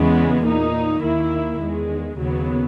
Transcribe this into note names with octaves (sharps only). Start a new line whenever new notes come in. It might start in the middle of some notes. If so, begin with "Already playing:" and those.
Already playing: E2 C#3 E3 G#3 B3
A#2 A#3 D#4
D#2 D#3 A#3 E4
E2 D#3 G#3
D#2 C#3 F#3 B3